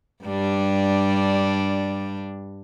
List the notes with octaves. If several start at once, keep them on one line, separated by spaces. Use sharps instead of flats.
G2 G3 D4